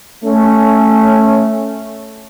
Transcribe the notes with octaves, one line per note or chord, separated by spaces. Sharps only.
A3 C#4